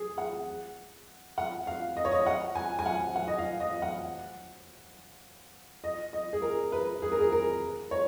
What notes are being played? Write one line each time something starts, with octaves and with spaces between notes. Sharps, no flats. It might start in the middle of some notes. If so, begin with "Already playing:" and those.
Already playing: G#4
F#5
F#5
F5
D#5
C#5
D#5
F#5
G#5
G#5
F#5
F#5
D#5
F5
D#5
F#5
D#5
D#5
G#4
A#4
B4
G#4
A#4
G#4
A#4
C#5